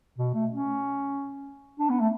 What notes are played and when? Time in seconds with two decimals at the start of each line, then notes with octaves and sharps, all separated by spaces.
0.18 B2
0.34 A3
0.51 C#4
1.79 D4
1.89 B3
2.00 A3